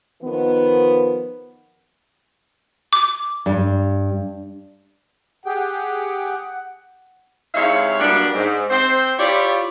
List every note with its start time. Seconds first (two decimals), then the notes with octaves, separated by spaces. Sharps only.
0.22 D#3 F3 B3
2.93 D6
3.46 G2
5.46 G4 G#4 F#5 G5
7.55 C3 G#3 D#4 E4 C#5 F5
8.00 F#3 G3 A#3 B3 D4
8.34 G#2
8.70 C4 C5
9.19 E4 F4 G4 C#5 D5